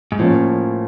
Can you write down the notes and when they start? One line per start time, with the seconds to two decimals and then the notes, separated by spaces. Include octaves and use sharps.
0.12 G#2
0.19 A2 F3 A#3 C#4